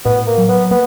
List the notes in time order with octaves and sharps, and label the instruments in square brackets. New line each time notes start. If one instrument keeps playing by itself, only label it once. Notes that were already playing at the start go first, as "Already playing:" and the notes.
[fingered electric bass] A2 [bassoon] B3
[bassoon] A#3
[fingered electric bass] F#3
[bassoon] B3
[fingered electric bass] A#3 [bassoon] B3